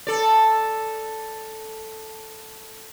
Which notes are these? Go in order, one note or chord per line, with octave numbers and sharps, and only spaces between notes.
A4 D5